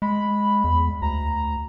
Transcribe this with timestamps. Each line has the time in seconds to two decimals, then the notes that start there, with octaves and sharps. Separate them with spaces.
0.02 G#3 B5
0.64 E2
1.02 D2 A#5